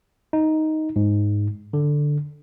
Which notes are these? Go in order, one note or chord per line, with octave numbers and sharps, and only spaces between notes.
D#4
G#2
D3